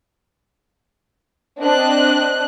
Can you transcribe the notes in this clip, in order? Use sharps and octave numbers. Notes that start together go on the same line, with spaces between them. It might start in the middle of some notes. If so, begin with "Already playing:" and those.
C4 D4 D#5 F#6